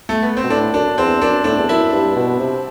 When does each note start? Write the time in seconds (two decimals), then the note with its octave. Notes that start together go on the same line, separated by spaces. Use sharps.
0.09 A3
0.22 B3
0.37 C4
0.43 B2
0.50 A2 D4
0.73 F#2 D4
0.98 E2 C4
1.21 F#2 D4
1.44 A2 D4
1.58 E2
1.68 F#2 E4
1.93 G2
2.16 B2
2.39 C3